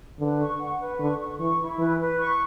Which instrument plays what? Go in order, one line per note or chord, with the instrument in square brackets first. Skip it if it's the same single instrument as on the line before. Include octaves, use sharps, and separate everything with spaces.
[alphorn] D3 [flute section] B4
[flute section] C#6
F#5
B4
[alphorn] D3 [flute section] C#6
[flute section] C#6
[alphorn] E3 [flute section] C#6
[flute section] E4
[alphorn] E3 [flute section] B4
[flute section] B4
C#6